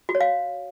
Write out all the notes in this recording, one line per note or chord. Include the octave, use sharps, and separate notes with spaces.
F#4
C#5
F5